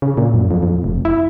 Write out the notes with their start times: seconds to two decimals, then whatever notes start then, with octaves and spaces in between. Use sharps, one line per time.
0.02 C#3
0.17 A#2
0.34 F#2
0.51 F2
0.63 F2
0.84 F1
1.05 E4